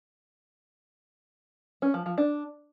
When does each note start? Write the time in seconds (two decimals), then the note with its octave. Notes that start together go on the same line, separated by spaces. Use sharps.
1.82 C#4
1.94 F3
2.06 F3
2.18 D4